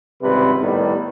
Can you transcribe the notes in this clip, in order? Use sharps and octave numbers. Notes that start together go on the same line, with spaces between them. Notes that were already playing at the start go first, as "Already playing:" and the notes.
G#1 C#2 C3 G3 B4
A2 D#3 G3 B3